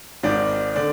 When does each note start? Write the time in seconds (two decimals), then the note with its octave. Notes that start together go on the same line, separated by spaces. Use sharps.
0.23 G#1 G#2 D#3 D5
0.76 D3 D5